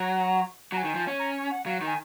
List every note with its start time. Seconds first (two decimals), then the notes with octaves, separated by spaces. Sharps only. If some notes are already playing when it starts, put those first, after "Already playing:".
Already playing: F#3 A#5
0.72 F#3 A#5
0.77 G#5
0.84 D#3
0.95 F3
1.07 C#4
1.19 A#5
1.51 F#5
1.66 F#3 F5
1.81 D#3 G#5